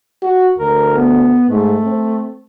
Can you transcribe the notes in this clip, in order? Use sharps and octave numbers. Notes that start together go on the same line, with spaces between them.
F#4
D2 A#4
B3
G#2 A3
C4